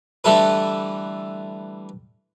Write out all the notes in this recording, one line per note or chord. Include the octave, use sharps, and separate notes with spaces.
D3 E3 G3 A3 A4 B4